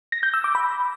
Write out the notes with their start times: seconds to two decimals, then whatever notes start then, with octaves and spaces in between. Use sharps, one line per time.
0.12 A#6
0.23 G6
0.34 E6
0.44 D6
0.55 B5